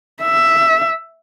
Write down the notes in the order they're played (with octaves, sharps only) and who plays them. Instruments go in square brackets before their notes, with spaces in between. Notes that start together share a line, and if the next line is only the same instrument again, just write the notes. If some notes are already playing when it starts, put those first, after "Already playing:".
[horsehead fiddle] E5